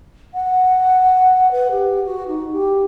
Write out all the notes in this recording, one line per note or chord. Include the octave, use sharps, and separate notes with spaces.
F#5
B4
G4
F#4
D#4
G4